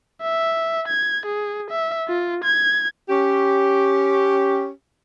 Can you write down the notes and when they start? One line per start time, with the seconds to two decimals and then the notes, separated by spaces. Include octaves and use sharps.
0.22 E5
0.88 G#6
1.26 G#4
1.70 E5
2.08 F4
2.44 G#6
3.09 C#4 G4